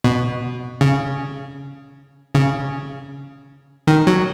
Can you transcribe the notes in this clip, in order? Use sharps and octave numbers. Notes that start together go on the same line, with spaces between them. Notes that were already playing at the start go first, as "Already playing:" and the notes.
B2
C#3
C#3
D#3
F#3